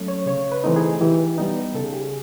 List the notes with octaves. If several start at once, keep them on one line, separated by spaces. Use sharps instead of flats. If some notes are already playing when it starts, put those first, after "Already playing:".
Already playing: F#3 A3 C#4
C#5
C#3 C#5
B4
E3 A3 C4 D#4
G#4
E3 G4
G3 B3 D#4
C#3 A4
G#4
G4
G#4